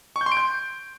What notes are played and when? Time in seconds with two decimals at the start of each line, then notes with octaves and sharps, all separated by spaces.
0.16 C#6
0.21 G6
0.26 C6
0.32 D7
0.37 G6